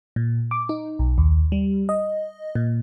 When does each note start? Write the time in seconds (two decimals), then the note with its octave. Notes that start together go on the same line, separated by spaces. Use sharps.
0.16 A#2
0.51 D6
0.69 D#4
0.99 B1
1.18 D#2
1.52 G3
1.89 D#5
2.55 A#2